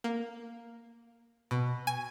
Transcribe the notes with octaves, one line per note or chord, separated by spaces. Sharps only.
A#3
B2
G#5